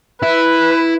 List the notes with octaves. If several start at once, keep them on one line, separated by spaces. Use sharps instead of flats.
E4 B4